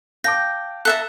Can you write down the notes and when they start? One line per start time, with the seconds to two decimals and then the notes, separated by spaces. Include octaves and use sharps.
0.24 F5 G5 A5 D6 A#6
0.85 A4 E5 A#5 F#6